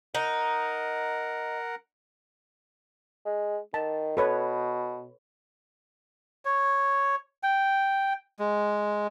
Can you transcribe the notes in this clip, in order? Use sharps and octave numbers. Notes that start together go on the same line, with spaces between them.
D#4 A#4 F#5
G#3
D#3 A5
B2 A4 B4 C#5
C#5
G5
G#3